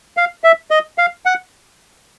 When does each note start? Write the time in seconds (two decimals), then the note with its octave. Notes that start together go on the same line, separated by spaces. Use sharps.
0.17 F5
0.44 E5
0.71 D#5
0.98 F5
1.26 F#5